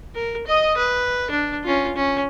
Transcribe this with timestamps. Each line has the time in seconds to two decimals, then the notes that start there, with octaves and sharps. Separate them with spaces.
0.15 A#4
0.47 D#5 D#6
0.77 B4
1.31 D4
1.64 C#4 F4
1.96 C#4